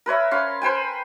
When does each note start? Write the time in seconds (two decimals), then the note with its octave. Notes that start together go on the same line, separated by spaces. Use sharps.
0.06 A#4 B4 C#5 E5
0.31 C#4 F5 C6
0.62 B4 C5 G5 G#5